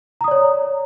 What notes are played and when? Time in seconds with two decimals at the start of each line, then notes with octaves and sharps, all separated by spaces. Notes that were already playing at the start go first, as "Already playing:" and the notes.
0.21 A#5
0.24 D#6
0.28 D5
0.31 C#5